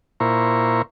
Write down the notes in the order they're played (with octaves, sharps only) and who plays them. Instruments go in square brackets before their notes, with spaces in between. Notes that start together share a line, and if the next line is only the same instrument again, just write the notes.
[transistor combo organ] A#2 E4 C5 A#5 C#6